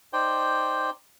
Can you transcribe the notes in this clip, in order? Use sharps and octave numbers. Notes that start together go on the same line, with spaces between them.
D#4 C5 D5 G5